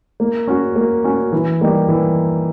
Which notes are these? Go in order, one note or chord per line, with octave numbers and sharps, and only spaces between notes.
A#3
C#4 F#4
A#3
C#4 F#4
E3
G3 A#3 D#4 G4
E3